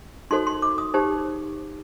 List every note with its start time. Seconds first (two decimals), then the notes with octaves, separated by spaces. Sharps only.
0.31 D#4 F#4 A4 C5 C6
0.47 C6
0.62 D6
0.78 D#6
0.94 D#4 G4 C5